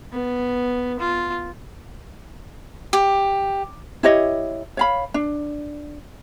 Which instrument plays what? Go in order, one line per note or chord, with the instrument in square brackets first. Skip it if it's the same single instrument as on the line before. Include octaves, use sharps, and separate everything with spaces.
[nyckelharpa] B3
F4
[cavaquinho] G4
[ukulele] E4 G4 C#5 D#5
C#5 F5 B5
D4